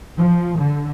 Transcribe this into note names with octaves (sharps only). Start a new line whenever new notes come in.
F3
D3